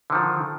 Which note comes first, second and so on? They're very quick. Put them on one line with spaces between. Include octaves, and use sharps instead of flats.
D3 D#3 F3